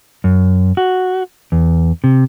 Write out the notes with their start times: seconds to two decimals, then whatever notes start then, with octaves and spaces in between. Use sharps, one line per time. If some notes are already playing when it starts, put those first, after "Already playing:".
0.24 F#2
0.77 F#4
1.52 E2
2.04 C3